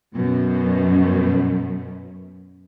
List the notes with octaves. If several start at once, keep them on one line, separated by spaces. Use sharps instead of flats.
F#2 B2